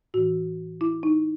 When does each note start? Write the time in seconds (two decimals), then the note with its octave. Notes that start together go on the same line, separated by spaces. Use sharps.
0.14 A2 E3 F#4
0.81 E4
1.03 D#4